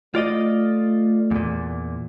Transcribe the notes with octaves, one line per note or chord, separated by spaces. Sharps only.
A3 F4 D5 D#5
E2 A#2